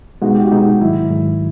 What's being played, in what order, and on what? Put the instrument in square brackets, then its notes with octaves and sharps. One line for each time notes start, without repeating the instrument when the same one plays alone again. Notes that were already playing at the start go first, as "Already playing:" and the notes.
[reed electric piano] B2 G#3 B3 D#4 [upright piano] F#4
[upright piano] G4
F#4
[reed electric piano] B2 G#3 B3 D#4
[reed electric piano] G#2 D#3 F#3 [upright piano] E4
[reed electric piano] G#2 D#3 F#3